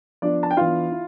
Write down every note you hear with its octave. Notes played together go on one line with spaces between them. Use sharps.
F3 B3 D4 F4 D5
A5
G5
E3 B3 D4 F4 F5
E4